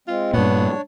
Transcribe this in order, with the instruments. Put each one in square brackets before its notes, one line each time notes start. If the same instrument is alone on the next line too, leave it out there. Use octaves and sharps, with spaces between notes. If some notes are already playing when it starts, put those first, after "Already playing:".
[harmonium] G#3 C4 [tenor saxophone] F4
[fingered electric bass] G2 A#2 [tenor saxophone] B3 [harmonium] D4 C#5